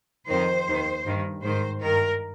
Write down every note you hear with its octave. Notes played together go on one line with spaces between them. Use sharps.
F2 D#3 C5
D#2 D#3
G2 D#3
G#2 D#3 C5
G2 D#3 A#4